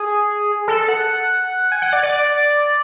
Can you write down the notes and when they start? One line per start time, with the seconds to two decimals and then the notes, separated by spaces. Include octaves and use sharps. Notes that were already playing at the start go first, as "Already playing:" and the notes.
Already playing: G#4
0.68 A4
0.89 F#5
1.72 G#5
1.82 F#5
1.93 D5
2.03 D5